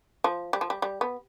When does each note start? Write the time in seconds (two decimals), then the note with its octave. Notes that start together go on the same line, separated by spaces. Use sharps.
0.24 F3
0.53 G3
0.61 F3
0.70 G3
0.82 G3
1.01 B3